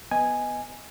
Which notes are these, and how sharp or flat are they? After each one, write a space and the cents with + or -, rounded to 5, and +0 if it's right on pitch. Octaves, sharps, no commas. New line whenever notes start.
B3 +0 D#5 +15 G#5 +0